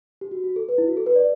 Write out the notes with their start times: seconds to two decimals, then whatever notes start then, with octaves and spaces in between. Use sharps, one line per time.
0.21 G4
0.31 F#4
0.44 F#4
0.56 A4
0.69 B4
0.78 E4
0.88 F#4
0.97 A4
1.06 B4
1.16 D5